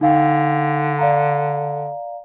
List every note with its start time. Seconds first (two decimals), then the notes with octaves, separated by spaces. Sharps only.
0.01 D3 D#4 F5 G5
0.99 D5 F5 A#5